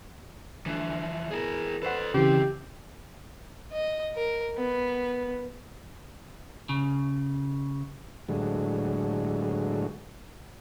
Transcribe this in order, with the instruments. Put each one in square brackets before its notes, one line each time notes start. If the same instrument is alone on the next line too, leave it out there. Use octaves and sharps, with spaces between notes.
[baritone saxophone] D2 [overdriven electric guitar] E3 F3
[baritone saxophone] E2 [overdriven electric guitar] G#4 A#4
[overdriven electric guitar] A4 C5 [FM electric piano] B4 F#5
[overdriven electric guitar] B1 C4 [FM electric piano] C#3 E3 [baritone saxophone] G4
[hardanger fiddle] D#5
A#4
B3
[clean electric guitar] C#3
[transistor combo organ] A2 D3 F#3 G#3